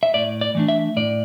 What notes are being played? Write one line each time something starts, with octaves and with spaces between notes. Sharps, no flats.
E5
A2 D5
D5
E3 A3 D4
E5
A2 D5